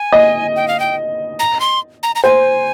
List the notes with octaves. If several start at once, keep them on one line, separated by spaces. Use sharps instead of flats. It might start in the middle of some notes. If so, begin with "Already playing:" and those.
Already playing: G#5
D#5
G5
F5
G5
A#5
C6
A#5
A#5
C5 G#5